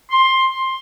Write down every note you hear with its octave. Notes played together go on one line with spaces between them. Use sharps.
C6